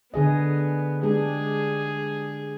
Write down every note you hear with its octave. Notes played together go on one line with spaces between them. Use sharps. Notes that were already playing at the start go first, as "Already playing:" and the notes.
D3 B3 G#4 D#5
G#3 D4 G4 G#4